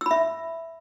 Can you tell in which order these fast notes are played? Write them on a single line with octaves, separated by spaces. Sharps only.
E6 B5 E5